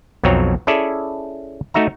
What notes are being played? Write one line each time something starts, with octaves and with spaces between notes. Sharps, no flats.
B1 F2 F#3 C4 C#5 A#5
C#4 E4 G#4 A4 D5 E5
A3 D#4 F#4 E5 A#5